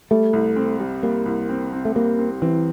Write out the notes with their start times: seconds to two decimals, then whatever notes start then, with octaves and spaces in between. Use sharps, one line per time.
0.11 G3 A3
0.33 C2
0.56 C4
0.80 G3
1.03 G3 A#3
1.26 C2
1.49 C4
1.73 C4
1.85 A3
1.95 G3 A#3
2.19 C4
2.42 E3 C4